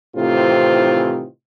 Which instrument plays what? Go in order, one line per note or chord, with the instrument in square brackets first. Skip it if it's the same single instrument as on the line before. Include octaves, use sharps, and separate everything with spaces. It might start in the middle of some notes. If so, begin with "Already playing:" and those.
[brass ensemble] A2 C3 D#3 E3 C4 F4